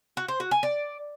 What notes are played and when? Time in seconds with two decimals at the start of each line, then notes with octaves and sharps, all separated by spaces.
0.17 F#4
0.28 C5
0.40 F#4
0.51 G#5
0.63 D5